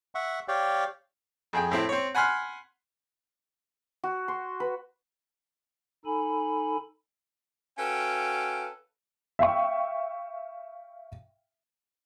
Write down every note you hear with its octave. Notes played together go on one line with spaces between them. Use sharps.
E5 F#5 C#6
G4 C#5 D5 F5 G5
F2 G#4 G5
A2 C4 E4
C4 C#5
F#5 G#5 B5 C6 F6 F#6
F#4
C6
B4
D#4 A4 G#5 B5
C#4 F#4 A4 B4 F5 G5
E5 F5 G5 C#6